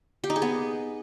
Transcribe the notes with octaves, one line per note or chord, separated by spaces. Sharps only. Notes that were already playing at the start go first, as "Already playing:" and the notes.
G4
D#4
G#4
B3